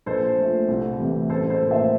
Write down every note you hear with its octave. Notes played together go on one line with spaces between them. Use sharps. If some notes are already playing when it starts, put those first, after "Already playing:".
A#1 A4 C5
A#2 A3
C2
C3 E3 A3 C4
A1 A4 C5
A4 C5
A2 F3 A#3
C5 E5